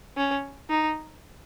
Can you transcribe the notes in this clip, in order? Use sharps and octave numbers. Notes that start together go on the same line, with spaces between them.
C#4
D#4